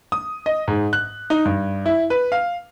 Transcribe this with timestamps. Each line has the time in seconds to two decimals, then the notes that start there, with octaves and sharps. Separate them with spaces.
0.12 D#6
0.46 D#5
0.68 G#2
0.93 F#6
1.30 D#4
1.45 G2
1.86 E4
2.10 B4
2.32 F5